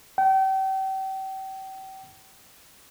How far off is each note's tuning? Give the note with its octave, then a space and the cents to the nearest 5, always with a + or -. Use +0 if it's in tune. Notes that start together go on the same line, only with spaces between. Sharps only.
G5 -35